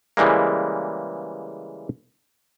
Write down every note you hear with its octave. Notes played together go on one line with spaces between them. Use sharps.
C#3 E3 G3 G#3 A#3